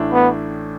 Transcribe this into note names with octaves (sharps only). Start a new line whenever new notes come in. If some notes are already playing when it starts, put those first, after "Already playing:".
Already playing: A1 A2 A3 D4
B3